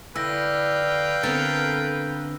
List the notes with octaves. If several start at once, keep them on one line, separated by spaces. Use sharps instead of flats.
D3 E4 B4 F5 G5 E6 A#6
D3 B3 C4 A4 A#4